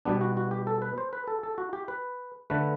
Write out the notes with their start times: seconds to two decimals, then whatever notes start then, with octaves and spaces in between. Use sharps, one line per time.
0.05 B2 G3 B3 D4
0.21 F#4
0.37 F#4
0.51 G4
0.67 A4
0.82 B4
0.98 C5
1.13 B4
1.27 A4
1.43 A4
1.58 F#4
1.73 G4
1.88 B4
2.50 D3 A3 B4